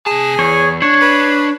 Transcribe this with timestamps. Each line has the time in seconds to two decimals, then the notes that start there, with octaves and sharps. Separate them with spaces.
0.07 C3 G#4 A5
0.39 E2 C#5
0.82 D4 C#5
1.02 B4